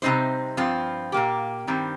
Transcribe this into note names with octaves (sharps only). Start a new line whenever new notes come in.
C3 G3 C4 D#4 C5
G2 F3 C4 F4
A#2 A#3 G4
G2 D#3 G3 C4